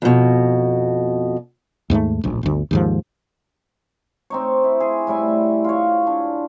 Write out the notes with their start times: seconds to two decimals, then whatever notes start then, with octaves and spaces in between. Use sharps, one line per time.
0.02 F2 B2
1.90 D#2 G#2 G#3 A3
2.24 D1 A#1
2.43 G1 D2
2.71 D#2 G#2 F3
4.30 C4 D#4 C#5
4.64 E4
4.80 G#4
5.07 A2 G3 E4 G#5
5.64 F4 C#5
6.07 D4